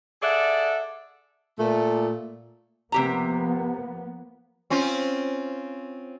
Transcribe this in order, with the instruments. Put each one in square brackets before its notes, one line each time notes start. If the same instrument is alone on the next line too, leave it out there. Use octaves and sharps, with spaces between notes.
[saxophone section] G#4 A4 D5 E5 F#5
[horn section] A#2 A3
[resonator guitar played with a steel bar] C3 G4 A#5 [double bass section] F3 A#3 B3
[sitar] C4 C#4 F4